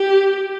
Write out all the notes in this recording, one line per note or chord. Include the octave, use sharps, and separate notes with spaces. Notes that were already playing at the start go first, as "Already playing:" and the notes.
Already playing: G4